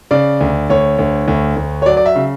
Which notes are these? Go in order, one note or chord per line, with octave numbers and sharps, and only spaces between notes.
C#3 D5
D2
D2 C#5
D2
D2
D2
C#5
F#3 D5
D5
E5
C#3